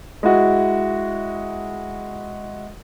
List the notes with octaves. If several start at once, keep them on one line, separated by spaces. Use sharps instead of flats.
G#3 E4 F#4